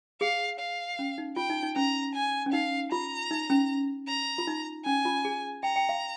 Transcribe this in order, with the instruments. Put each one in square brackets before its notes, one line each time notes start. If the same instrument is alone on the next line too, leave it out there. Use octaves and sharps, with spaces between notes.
[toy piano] G#4 [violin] F5
[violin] F5
[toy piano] C#4
D#4
[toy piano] F4 [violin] G5
[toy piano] D#4
D#4
[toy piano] C#4 [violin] A#5
[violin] G#5
[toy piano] C#4
[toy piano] D#4 [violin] F5
[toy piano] F4 [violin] A#5
[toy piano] D#4
C#4
[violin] A#5
[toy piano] F4
D#4
[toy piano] C#4 [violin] G#5
[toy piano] F4
G#4
[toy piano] G5 [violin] A#5
[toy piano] G5
F5